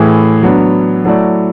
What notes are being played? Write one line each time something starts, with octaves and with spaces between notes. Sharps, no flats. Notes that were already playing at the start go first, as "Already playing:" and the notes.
Already playing: A2 E3 A3 E4 G#4
F#3 B3 D4
F#3 A3 E4 A4 D5